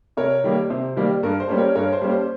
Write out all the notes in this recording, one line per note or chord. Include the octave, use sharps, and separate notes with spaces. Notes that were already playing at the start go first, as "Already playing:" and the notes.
C3 A#4 C#5
D#3 G3 A#3
C3 C5
D#3 G3 A#3
G2 A#4
C5
G3 A#3 C#4
A#4 C#5
G2 A#4 C#5
C5
G3 A#3 C#4
C5